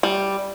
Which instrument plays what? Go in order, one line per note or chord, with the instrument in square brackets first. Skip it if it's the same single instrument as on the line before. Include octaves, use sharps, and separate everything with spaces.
[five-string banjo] G3